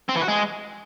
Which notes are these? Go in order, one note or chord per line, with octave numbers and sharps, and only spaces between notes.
C4
E3
F#4
G#3